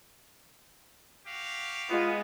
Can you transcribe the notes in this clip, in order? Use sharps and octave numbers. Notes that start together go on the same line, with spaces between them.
F#4 G4 F5
G#3 B3 F4